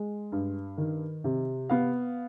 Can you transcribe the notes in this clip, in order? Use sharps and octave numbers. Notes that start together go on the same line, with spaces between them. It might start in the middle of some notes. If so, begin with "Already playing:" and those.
Already playing: G#3
G2
D#3
C3
B3 F5